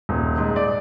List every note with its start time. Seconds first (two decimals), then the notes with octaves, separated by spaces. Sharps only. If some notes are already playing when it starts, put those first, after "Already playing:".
0.09 D#1
0.38 G#2
0.56 D5